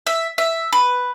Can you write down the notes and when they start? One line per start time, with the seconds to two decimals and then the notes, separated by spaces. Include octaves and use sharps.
0.07 E5
0.38 E5
0.73 B4